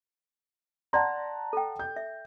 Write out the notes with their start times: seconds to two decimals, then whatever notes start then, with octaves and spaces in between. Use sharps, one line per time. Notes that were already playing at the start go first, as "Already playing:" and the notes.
0.93 D5 F#5 A5 A#5 C6
1.53 A4 G5
1.79 G6
1.96 E5